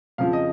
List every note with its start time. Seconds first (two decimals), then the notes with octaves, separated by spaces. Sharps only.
0.18 F2 C#3 F3 F5
0.33 D#5